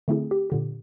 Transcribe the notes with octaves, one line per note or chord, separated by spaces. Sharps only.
D3 A3 C4 E4 G#4
G4
A#2 D3 G4